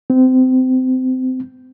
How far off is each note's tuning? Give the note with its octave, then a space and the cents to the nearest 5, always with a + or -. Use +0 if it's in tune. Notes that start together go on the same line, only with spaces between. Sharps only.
C4 -25